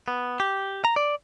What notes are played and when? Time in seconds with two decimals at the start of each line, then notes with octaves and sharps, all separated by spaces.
0.08 B3
0.40 G4
0.85 A#5
0.96 D5